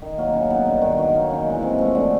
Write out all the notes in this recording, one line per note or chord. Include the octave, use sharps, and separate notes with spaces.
D#3
F#3 A#3
C#3
F#3 B3 D#4
G2
D#3 F#3
F#3
A#3 D#4
C#3
E3 G#3
C3
F3 A3
D3